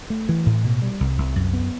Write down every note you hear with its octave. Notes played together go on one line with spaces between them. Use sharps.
A3
E3
A2
B2
G3
C2
C2
F#2
B3